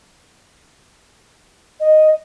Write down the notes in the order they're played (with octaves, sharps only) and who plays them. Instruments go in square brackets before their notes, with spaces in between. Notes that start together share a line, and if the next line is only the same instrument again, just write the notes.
[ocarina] D#5